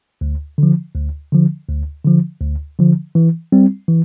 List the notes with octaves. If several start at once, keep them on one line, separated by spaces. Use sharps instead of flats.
D2
D3 F3
D2
D3 F3
D2
D3 F3
D2
D3 F3
E3
G3 C4
E3